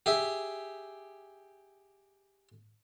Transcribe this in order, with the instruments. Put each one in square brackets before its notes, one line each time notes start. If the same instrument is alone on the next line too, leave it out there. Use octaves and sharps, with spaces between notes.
[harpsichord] G4 G#4 E5